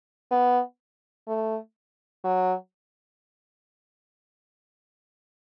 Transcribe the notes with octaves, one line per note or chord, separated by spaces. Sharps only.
B3
A3
F#3